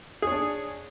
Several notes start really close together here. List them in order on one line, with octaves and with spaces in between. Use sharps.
G#4 C#5 D4